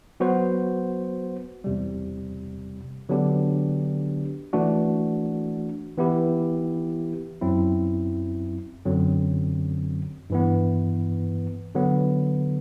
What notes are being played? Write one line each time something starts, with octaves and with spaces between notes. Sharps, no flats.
F#3 B3 F#4 C5
E2 C3 G3
D3 F#3 B3 D4 G4
E3 A3 D4 F#4
E3 B3 E4 G4
F#2 F#3 C4 E4
F#2 D3 F#3 C4
G2 E3 B3
D3 F#3 B3